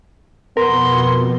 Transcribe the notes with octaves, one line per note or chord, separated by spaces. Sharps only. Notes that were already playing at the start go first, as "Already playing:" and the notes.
F2 B2 B3 A#4 C6